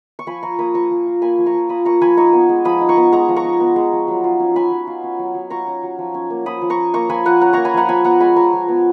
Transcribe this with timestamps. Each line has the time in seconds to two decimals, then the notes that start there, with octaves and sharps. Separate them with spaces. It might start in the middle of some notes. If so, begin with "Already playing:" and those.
0.19 C#6
0.27 F3 G#5 B5
0.43 F4 A#5 C#6
0.59 A#3 B5 D#6
0.74 F3 A#5 C#6
0.91 F3
1.07 F4
1.22 A#3 G#5 B5
1.38 F3
1.46 A#5 C#6
1.54 F3
1.69 F4 B5 D#6
1.85 A#3 A#5 C#6
2.01 F3 G#5 B5
2.17 D#4 A#5 C#6
2.33 B3
2.49 G#3
2.65 F3 B5 D#6
2.81 D#4
2.89 A#5 C#6
2.97 B3
3.12 G#3 A#5 C#6
3.29 F3
3.36 A#5 C#6
3.44 D#4
3.60 B3
3.76 G#3
3.93 F3
4.08 F#3
4.24 F4
4.40 C#4
4.56 F#3 G#5 B5
4.71 F#3
4.87 F4
5.04 C#4
5.19 F#3
5.34 F#3
5.50 F4 A#5 C#6
5.67 C#4
5.83 F#3
5.98 F3
6.14 C#4
6.30 A#3
6.46 F3 B5 D#6
6.62 F3
6.70 A#5 C#6
6.78 C#4
6.94 A#3 A#5 C#6
7.09 F3 G#5 B5
7.25 F3 F#5 A#5
7.41 C#4 F#5 A#5
7.53 A#3 A#5 C#6
7.65 G#5 B5
7.74 F3 F#5 A#5
7.89 F3 G#5 B5
8.04 B3 F#5 A#5
8.20 G#3 G#5 B5
8.36 F3 A#5 C#6
8.53 F3
8.68 B3